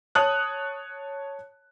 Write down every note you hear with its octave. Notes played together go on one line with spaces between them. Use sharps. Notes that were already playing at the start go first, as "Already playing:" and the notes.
C#5 A5 D#6 F#6